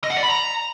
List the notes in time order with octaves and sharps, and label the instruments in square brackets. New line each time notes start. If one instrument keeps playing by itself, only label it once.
[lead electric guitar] D#5
F#5
D5
B5
A#5